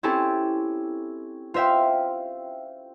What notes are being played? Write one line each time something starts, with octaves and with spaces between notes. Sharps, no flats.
C4 C#4 E4 G4 A4
F4 C5 E5 F5 G5